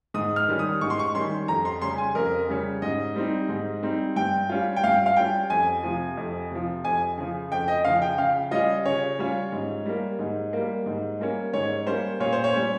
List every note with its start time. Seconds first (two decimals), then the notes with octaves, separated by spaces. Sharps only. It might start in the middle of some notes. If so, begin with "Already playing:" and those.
0.14 G#2 D#6
0.36 F6
0.48 D#3 G3 C#4
0.59 D#6
0.81 G#2 C#6
0.90 C6
0.99 C#6
1.15 D#3 G3 C#4 C6
1.48 F2 A#5
1.65 C6
1.82 C#3 G3 C#4 C6
1.98 G#5
2.15 F2 A#4
2.49 C#3 G3 C#4
2.82 G#2 D#5
3.15 G3 C4 D#4
3.49 G#2
3.83 G3 C4 D#4
4.16 G2 G5
4.49 G3 C#4 F4
4.76 G5
4.83 G2 F5
5.06 F5
5.16 G3 C#4 F4 G5
5.50 F2 G#5
5.83 C3 F3
6.17 F2
6.51 C3 F3
6.84 F2 G#5
7.18 C#3 F3
7.52 F2 G5
7.68 D#5
7.85 C#3 F3 F5
8.02 G5
8.18 C#3 F5
8.51 G3 C#4 F4 D#5
8.85 C#3 C#5
9.19 G3 C#4 F4
9.52 G#2
9.86 G3 A#3
10.19 G#2
10.53 G3 A#3
10.86 G#2
11.20 G3 A#3 C#4
11.53 G#2 C#5
11.86 G3 A#3 C#4 C5
12.20 A#2 C#5
12.32 C5
12.44 C#5
12.54 G3 C#4